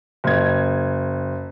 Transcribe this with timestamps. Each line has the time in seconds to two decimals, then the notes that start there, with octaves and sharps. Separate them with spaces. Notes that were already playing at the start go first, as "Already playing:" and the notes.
0.24 F#1 G#6